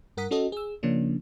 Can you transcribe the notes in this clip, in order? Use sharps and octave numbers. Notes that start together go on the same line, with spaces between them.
G2 A#4 F#5 D#6 B6
C#4 F#4 A4 D#5
G#4 E6
C#3 F3 A#3 C#4 D4